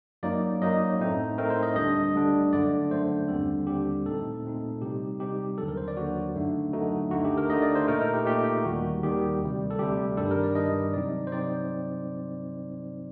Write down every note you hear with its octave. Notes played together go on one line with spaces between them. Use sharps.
F#2 F#3 A#3 D#4 D5
F#2 F#3 A#3 D#4 D#5
A2 A3 C4 D#4
A2 A3 C4 D#4 A#4
C5
D#5
D2 D3 G3 D4 D#5
D2 D3 G3 D4
F#2 D3 A3 D5
F#2 D3 A3 C5
D#2 D3 G3 C4 A4
D#2 D3 G3 C4 G4
A#2 A3 C4 D#4 A4
A#2 A3 C4 D#4
C3 G3 C4 D#4 G4
C3 G3 C4 D#4 G4
D#2 D3 F#3 A4
A#4
C5
D5
D#2 D3 F#3 F#4
F#2 D3 A3 D#4
F#2 D3 A3 D#4 F#4
D2 D3 A3 D#4 F#4
G4
A#4
D2 D3 A3 D#4 D#5
D5
C5
A#2 A3 D#4 A#4
A#4
G4
A#2 A3 D#4 G4
D#2 D#3 G3 F#4
D#2 D#3 G3 G4
D2 C3 G3
A4
D2 C3 G3 G4
G2 D#3 G3 D4 A4
A#4
D5
G2 D#3 G3 D4 D#5
C3 F#3 C4 D#4 D5
C5
C3 F#3 C4 D#4 D5